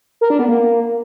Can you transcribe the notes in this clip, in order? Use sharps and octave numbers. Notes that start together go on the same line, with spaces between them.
A#4
D4
B3
A#3